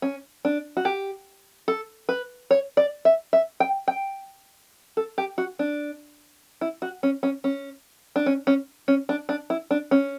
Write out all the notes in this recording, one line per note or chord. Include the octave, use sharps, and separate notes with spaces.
C#4
D4
F#4
G4
A4
B4
C#5
D5
E5
E5
G5
G5
A4
G4
F#4
D4
E4
F#4
C#4
C#4
C#4
D4
C#4
C#4
C#4
D4
D4
E4
D4
C#4